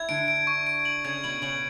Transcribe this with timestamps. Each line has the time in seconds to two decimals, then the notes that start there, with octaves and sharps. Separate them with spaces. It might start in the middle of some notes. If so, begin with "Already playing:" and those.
Already playing: E4 G#6
0.08 D3 D4 D7
0.28 D7
0.47 C#6
0.67 D7
0.85 F#7
1.04 C#3 C#4 G#6
1.24 B2 B3 F#7
1.42 C#3 C#4 F#7